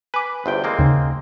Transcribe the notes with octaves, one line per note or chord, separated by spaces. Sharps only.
B4 G#5 D6
G1 E2 C5 G5
G#3 A#3 C4
D#2 C#3